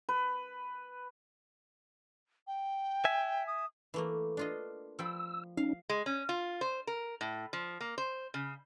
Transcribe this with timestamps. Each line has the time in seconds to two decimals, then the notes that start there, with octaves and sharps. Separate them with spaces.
0.09 B4
2.47 G5
3.05 E5 G#5
3.47 D#6
3.94 E3 A3 A#3
4.37 D4 F4 D#5
4.99 F3 G5 B5 E6
5.57 C#4 D#4 F5
5.89 G#3
6.06 C#4
6.29 F4
6.61 C5
6.87 A#4
7.21 A2
7.53 F3
7.81 A#3
7.98 C5
8.34 C#3